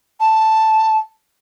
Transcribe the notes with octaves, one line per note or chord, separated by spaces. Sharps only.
A5